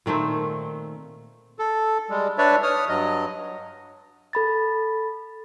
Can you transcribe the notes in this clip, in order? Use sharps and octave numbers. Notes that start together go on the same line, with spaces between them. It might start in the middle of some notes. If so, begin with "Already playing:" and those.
A#2 D#3 A3 C4
A4
G3 G#3
D4 B4 C#5 D5 E5
C#5 D#6 F6
G2 F#3 D#5
A4 B5 A6